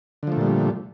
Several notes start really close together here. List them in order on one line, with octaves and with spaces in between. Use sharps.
D3 F3 A3 A#2 G3